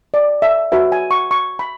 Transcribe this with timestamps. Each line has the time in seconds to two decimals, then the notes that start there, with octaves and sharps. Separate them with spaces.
0.14 D5
0.42 E5
0.72 F#4 B4 E5
0.92 G#5
1.11 C#6
1.31 C#6
1.59 B5